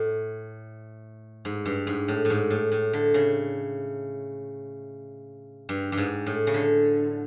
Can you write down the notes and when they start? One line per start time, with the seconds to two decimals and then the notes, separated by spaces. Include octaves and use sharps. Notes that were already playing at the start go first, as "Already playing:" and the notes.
Already playing: A2
1.45 G#2
1.66 G2
1.87 G#2
2.08 A2
2.25 A2
2.30 G#2
2.50 A2
2.72 A2
2.93 D3
3.14 C#3
5.69 G2
5.92 G2
5.98 G#2
6.27 A2
6.47 C#3
6.54 D3